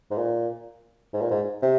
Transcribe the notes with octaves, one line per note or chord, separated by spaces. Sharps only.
G#2
A#2
G#2
A#2
G#2
C3